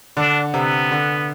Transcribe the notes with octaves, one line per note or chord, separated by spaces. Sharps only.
D3 D4
C3 B3
D3